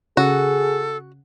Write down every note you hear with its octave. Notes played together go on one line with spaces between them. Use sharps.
C#3 F#4 G#4 A4